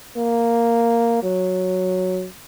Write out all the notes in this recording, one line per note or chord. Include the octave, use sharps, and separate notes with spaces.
A#3
F#3